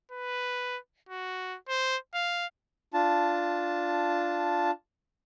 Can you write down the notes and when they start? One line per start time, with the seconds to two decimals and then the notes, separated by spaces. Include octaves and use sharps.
0.11 B4
1.09 F#4
1.69 C5
2.14 F5
2.94 D4 F4 A5